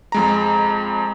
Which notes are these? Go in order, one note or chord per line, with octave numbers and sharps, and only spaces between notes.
F2 G#3 A#5